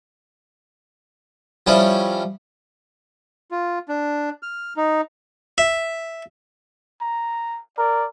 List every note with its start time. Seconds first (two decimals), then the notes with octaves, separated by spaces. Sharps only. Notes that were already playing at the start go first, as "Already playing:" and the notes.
1.67 F3 G3 C#4 E4
3.51 F4
3.89 D4
4.43 F6
4.77 D#4
5.58 E5
7.01 A#5
7.78 A#4 D5